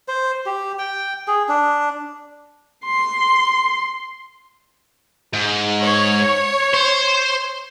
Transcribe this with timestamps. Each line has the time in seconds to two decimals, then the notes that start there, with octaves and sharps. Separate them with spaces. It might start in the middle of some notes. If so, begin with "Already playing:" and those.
0.08 C5
0.46 G4
0.79 G5
1.28 G#4
1.49 D4
2.84 C6
5.33 G#2
5.82 C#5
6.73 C5